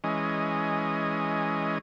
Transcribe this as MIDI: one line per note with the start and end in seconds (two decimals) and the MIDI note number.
0.04 1.78 52
0.04 1.78 56
0.04 1.78 61
0.04 1.78 75